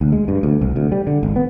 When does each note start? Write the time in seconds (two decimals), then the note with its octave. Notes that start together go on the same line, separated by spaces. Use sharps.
0.01 D2
0.12 G#3
0.28 G2
0.43 D2
0.61 C2
0.76 D2
0.92 G3
1.07 D3
1.23 G#1
1.36 B3